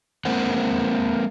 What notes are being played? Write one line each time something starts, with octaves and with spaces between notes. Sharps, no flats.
G#3 A#3 C4 F#5